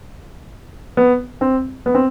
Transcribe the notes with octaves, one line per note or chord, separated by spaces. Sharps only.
B3
C4
B3
C4